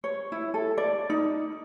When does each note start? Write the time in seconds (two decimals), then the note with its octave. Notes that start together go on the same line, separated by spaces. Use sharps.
0.04 C#5
0.32 E4
0.54 A4
0.78 D5
1.10 D#4